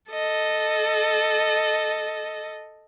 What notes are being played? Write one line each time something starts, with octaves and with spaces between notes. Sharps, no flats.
A4 D#5